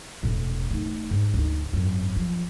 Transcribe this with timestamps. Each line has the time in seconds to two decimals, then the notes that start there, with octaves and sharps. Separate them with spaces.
0.23 E1 A2
0.71 A3 D#4
1.11 G#2
1.34 D2 D#4
1.73 G#1 F#2
2.16 F3